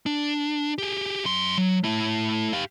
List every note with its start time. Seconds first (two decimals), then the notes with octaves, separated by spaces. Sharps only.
0.06 D4
0.78 G4 G#4
1.25 F#2 C6
1.58 F#3
1.84 A3 E4
2.53 G4 F5